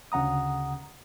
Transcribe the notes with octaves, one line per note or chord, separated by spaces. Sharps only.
D2 C#3 F#5 A#5 D#6